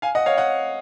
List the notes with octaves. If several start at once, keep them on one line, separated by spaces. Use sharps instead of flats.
F5 G#5
D#5 F#5
C#5 F5
D#5 F#5